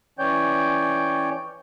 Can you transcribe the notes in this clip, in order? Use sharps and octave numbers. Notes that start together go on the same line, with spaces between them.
E3 C#4 C#5 D5 G5 G6